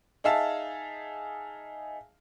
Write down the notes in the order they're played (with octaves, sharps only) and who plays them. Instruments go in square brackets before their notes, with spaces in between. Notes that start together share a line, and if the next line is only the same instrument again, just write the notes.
[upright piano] D#4 G#4 E5 F5 A5